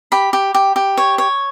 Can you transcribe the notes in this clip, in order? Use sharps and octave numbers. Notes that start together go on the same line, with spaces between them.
G4 B5
G4
G4
G4
C#5
C#5